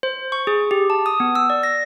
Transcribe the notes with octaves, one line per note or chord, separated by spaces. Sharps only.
C5
C#6
G#4
G4
A5
D#6
B3
E6
D5
A#6